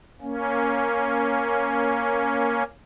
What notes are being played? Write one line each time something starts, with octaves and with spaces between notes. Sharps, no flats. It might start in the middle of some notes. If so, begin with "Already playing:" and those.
A#3 C#4